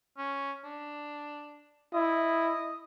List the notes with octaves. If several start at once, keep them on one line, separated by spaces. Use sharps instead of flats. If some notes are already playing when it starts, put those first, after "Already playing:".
C#4
D4
E4 D#5